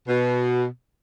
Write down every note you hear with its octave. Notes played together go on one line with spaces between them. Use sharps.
B2